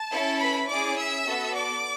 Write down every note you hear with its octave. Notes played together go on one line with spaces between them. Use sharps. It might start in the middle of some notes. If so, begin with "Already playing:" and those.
Already playing: A5
C#4 E4 A4
B4 B5
C#4 E4 G#4 D5 D6
E5 E6
B3 F#4 A4
D5 D6